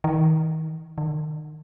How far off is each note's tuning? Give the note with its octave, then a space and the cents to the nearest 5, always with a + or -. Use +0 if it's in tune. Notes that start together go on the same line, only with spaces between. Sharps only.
D#3 +35
D#3 -30